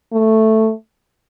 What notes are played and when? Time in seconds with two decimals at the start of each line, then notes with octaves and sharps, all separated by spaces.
0.13 A3